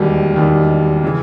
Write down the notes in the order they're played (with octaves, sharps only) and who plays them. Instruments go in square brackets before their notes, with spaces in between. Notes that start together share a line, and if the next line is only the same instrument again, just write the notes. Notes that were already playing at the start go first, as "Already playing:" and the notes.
Already playing: [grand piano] E1 D#2 D#3 G3
E1 D#2 D#3 G3
C#3 E3